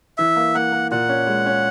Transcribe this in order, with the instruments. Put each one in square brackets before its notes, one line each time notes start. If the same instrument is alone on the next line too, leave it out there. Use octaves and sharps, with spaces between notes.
[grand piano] E3 [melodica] E5
[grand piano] A#3
[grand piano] A#3 [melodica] F#5
[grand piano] A#3
[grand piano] A#2 [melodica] F#5
[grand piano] C#4
G#3
C#4